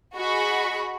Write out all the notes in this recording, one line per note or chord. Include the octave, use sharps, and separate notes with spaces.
F#4 G#4 D#5 B5 C#6